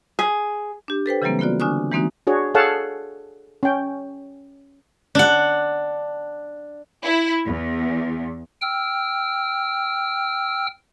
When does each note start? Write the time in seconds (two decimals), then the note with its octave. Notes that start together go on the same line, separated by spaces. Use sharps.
0.19 G#4
0.88 D4 G4
1.06 A4 B4 C5 G5
1.22 C#3 E3 F#3 G3 A#3 C4
1.39 A#3 B3 F4 F#4 D5
1.60 D3 D4 G#5 C#6 D#6 F#6
1.91 E3 G#3 A#3 C4 D#4 F#4
2.27 D4 F#4 G#4 C#5
2.54 G#4 A4 C#5 F5 F#5 A5
3.63 C#4 G5
5.15 D4 F#5
7.02 E4
7.46 E2
8.62 G5 E6 F6